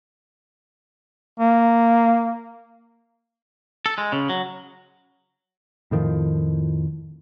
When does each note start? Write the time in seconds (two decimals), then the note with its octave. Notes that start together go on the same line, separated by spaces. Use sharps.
1.40 A#3
3.86 A4
3.98 G#3
4.12 C#3
4.29 F#3
5.91 F2 A2 D#3 F3